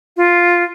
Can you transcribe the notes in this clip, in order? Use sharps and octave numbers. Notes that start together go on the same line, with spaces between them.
F4